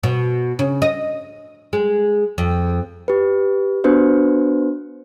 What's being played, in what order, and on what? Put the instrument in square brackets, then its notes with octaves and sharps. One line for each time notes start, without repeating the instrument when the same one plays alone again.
[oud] B2
C#3
D#5
G#3
F2
[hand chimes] G4 B4
B3 D4 F#4 B4 C5